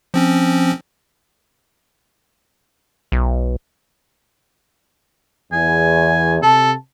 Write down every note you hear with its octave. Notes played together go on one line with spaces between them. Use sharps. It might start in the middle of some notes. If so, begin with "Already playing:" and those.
F3 C4 C#4
B1
E2 G#5
C3 G4 A4 A5